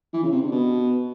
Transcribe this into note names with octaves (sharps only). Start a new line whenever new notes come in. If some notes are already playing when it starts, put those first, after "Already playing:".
E3
C#3
C3
D3
B2